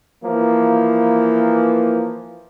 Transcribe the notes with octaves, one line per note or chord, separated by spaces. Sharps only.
E3 F3 A#3